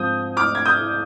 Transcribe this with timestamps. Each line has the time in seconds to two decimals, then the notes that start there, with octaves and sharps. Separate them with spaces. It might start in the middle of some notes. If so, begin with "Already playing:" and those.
Already playing: G#2 F3 C4 D#6 G6
0.37 D6 F6
0.55 G#6
0.65 D#6 G6